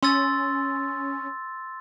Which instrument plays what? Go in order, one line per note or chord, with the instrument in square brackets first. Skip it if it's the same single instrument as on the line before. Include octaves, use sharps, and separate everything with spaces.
[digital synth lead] C#4 [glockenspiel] C6 E6 A6